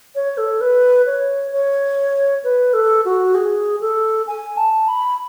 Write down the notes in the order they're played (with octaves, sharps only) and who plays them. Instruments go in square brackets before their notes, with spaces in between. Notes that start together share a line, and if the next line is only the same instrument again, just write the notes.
[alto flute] C#5
A4
B4
C#5
C#5
B4
A4
F#4
G#4
A4
G#5
A5
B5